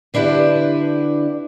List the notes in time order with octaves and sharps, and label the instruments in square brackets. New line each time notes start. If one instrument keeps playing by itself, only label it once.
[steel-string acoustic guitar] D3 D4 E4 G4 B4